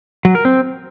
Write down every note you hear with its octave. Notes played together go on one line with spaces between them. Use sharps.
F#3
A#4
C4